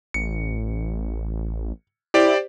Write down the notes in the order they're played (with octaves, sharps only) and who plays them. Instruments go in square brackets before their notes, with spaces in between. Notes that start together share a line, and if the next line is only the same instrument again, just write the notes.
[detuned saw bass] A1 [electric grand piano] C#7
[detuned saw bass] E4 [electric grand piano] G4 C5 D5